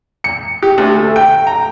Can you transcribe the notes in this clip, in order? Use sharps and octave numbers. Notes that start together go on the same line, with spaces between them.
C#7
G4
D2
A3
G5
A#5